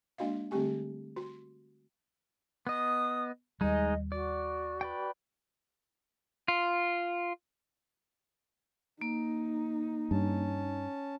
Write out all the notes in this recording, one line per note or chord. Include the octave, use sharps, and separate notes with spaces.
G#3 A#3 D4 F#4 D#5 F5
D3 G3 A3 C4 G4 G#5
F#4
B3 D#5 D#6
D#2 G3 G#3 D#4 D#5 G#5
F#4 D5
B4 D5 G5
F4
A#3 D#4
G2 C#4 A5